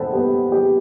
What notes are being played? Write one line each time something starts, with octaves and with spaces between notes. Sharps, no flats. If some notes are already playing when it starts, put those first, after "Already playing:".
Already playing: A4 C5 F#5 G5 A5 B5
G4 B4
G4